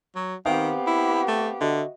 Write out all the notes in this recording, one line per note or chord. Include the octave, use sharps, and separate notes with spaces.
F#3
D#3 B3 C4 G4 F5 G5
E4
A3
D3 F#4 D#5 E5